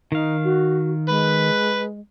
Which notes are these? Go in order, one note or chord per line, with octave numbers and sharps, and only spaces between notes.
D#3 D#4 F5
F#4
G#3 B4